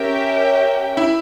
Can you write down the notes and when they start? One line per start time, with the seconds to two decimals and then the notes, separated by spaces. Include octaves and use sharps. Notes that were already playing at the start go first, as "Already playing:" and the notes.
Already playing: C#4 G4 A#4 E5 G5
0.97 E4